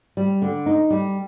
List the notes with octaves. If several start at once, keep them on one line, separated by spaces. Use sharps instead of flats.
G3
D3
D#4
G3